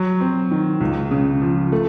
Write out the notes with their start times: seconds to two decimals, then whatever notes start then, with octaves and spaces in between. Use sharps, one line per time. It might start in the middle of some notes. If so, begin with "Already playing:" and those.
Already playing: F#3
0.20 C4
0.51 D#3
0.80 C#2
1.11 C#3
1.42 F3
1.72 A3